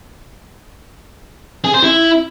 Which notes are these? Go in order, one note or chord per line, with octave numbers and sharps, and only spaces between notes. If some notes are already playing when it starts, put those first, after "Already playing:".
G#4
C5
E4